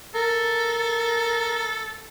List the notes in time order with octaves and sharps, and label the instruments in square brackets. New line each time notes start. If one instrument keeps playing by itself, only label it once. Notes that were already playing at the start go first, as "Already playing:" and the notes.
[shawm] A4 [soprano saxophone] A#4